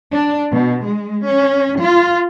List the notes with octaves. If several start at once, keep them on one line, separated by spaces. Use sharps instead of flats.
D4
B2
G#3
C#4
F4